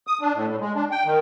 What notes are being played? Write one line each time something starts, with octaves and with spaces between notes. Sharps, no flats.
D#6
D4
A2
A2
G#3
D4
G5
D#3